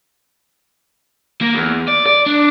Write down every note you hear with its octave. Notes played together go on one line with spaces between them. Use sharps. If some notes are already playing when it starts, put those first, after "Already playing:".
A#3
E2
D5
D5
D4